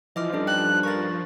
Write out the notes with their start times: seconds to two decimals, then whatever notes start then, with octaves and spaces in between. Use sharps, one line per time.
0.16 E3 F3 D#5 D6 F6
0.33 G2 C#4 D#4 A4
0.47 G5 A5 F#6
0.83 F3 A#4 C#6 A6